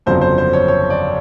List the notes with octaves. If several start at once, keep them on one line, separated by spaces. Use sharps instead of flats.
G1 F2 C#3 F#3 C5
C5
C5
C#5
C#5
D5